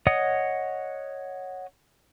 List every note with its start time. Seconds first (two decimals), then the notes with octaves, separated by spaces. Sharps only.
0.07 C#5 D#5 F#5 D#6